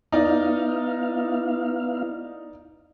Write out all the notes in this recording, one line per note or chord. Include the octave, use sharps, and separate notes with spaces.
B3 D#4 E4 D5 D#5 F5